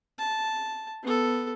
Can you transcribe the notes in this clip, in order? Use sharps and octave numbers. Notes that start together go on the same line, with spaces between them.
A5
B3 A4